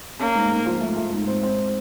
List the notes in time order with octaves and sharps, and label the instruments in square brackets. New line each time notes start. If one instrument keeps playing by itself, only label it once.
[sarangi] A#3 [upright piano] C#4
[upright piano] G#2
G#2
F3
A3
A3
G#2
C4
C4